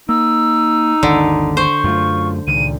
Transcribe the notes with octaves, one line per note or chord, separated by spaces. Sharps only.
A#3 D#4 E6
G#1 D#2 D3
C5 C#6
F#2 A3 F4
C#2 A#2 D#3 D#7